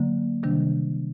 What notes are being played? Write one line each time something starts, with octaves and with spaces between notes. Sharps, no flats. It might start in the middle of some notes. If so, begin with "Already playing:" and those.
Already playing: D3 F#3 A#3
C3 D#3 G3 D4